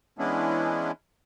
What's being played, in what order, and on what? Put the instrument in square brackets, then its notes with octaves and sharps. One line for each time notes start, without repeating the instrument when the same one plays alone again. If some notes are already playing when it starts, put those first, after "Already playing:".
[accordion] E3 G#3 B3 C#4 D4 E4